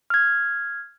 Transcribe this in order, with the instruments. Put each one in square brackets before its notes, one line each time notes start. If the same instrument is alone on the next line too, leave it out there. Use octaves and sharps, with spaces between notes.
[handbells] F6 G#6